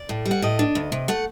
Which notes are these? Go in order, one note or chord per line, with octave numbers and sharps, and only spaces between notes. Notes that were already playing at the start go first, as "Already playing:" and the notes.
Already playing: D5
A2
G3
F#5
A2 D#5
D4
D2
C3
A3 F#5